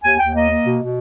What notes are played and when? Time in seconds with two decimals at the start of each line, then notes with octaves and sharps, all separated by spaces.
0.04 D#2 G#5
0.19 D#2 G5
0.34 A#3 D#5
0.49 A#3
0.65 B2
0.80 B2